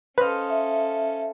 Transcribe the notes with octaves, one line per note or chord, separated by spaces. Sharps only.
C#4 A4 B4 C5 D#5 F5 B5
E5